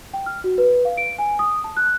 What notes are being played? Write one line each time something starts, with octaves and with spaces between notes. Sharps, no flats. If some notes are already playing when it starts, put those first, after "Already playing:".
G5
F6
F#4
B4
F5
D7
G#5
D#6
A5
F#6